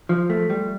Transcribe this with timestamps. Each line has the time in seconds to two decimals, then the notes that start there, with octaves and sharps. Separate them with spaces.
0.09 F3
0.30 A3
0.50 G3